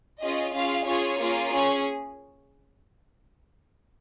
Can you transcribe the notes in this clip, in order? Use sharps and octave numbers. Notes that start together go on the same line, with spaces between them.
C#4 F4 G#4 D#5
C#4 F4 G#4 F5
C#4 F4 G#4 C#5
A#3 C#4 F4 G#4
C#4 G#4 C#5